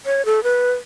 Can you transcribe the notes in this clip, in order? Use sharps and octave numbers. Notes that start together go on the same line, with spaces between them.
C#5
A4
B4